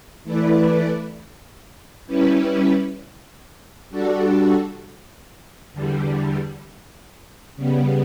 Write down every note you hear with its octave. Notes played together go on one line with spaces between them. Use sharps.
E3 A3 E4 B4 D5
G3 C#4 E4 B4
G3 D4 F#4 A4
E2 D3 G3
C#3 G3 B3